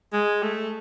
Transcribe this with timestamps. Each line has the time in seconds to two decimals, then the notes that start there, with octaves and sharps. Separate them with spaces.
0.13 G#3
0.43 A3